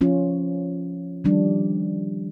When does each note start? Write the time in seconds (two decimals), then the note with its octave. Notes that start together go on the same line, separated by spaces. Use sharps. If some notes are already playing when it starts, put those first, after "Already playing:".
0.01 F3 C#4 F4
1.24 D#3 F3 G3 D4